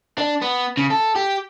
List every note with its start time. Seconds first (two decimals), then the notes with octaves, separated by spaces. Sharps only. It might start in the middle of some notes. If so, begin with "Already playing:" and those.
0.18 D4
0.42 B3
0.77 C#3
0.90 A4
1.16 G4